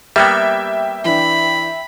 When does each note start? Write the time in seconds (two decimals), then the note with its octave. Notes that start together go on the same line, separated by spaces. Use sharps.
0.16 G3 A#3 B3 G4 E5 G5
1.05 E3 D4 B5